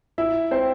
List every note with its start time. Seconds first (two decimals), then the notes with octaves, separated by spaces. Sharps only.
0.18 E4 E5
0.51 C4 C5